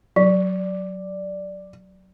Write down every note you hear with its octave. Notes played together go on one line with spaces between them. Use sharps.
F#3 D5